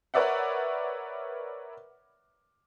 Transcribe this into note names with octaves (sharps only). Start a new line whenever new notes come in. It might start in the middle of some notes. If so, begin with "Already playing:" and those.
A#4 B4 C#5 D5 E5 F#5